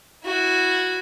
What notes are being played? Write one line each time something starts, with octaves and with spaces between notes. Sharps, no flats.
E4 F#4